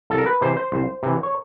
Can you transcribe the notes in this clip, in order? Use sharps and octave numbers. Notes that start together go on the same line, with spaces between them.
C2 A4
A#4
B4
C3 E3 C5
C5
C2
C3 E3
C#5